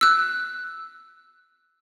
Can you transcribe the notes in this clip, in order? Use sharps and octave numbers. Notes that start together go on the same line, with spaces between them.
E6 F#6